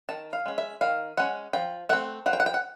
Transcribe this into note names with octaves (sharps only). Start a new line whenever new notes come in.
D#3 A5
F5
G#3 C#4
E5
D#3 F5
G#3 C#4 F#5
F3 G5
A3 C4 F#5
F3 F#5
G5
F#5
G5
F#5